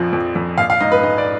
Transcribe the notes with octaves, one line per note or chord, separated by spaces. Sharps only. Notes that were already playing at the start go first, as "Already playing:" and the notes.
Already playing: A#1 F2 F3
F2
F2
A#1 F5
F5
G#2 D#5
B4
G#2 D#5
D5